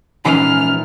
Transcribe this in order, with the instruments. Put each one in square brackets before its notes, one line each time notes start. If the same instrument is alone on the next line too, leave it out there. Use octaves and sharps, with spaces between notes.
[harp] A#1 E3 C7 [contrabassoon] G#2 [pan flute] C#4 [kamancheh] F6